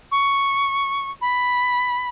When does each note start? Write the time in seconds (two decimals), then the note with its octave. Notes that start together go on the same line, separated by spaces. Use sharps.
0.12 C#6
1.21 B5